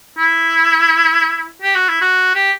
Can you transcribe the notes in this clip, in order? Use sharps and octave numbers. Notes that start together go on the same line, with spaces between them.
E4
G4
F#4
E4
F#4
G4